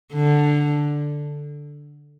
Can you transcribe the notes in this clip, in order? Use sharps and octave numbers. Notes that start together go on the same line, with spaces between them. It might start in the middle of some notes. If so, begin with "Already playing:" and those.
D3